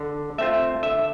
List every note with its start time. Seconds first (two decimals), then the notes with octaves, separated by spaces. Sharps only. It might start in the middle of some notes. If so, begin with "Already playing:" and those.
Already playing: D3
0.38 A3 C4 F4 E5
0.83 D3 E5